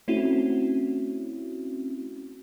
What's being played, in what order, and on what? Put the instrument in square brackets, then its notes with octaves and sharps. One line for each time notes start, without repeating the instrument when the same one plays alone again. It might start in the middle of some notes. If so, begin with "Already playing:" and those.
[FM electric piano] A3 C4 C#4 E4 F#4